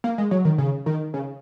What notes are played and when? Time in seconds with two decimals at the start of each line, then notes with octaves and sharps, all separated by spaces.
0.04 A#3
0.18 G#3
0.31 F#3
0.45 D#3
0.58 C#3
0.86 D#3
1.14 C#3